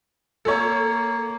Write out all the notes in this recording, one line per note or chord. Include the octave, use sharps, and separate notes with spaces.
A#3 A4 C#5